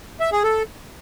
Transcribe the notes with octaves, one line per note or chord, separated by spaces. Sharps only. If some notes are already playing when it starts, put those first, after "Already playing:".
E5
G#4
A4